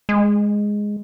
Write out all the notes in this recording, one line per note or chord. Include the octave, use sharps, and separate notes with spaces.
G#3